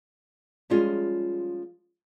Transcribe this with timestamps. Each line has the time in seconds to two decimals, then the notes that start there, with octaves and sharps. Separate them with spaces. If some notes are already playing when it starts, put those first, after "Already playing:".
0.70 F3 G3 G#3 C#4 F4